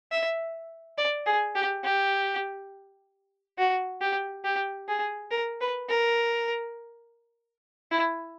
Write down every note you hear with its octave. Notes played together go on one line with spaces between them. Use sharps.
E5
D5
G#4
G4
G4
F#4
G4
G4
G#4
A#4
B4
A#4
E4